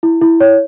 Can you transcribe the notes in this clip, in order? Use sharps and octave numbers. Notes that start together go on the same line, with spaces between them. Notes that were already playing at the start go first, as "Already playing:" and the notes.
E4
E4
C#5